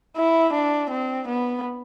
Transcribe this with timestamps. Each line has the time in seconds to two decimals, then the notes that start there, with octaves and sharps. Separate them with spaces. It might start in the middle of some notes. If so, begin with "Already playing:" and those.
0.17 E4
0.54 D4
0.91 C4
1.28 B3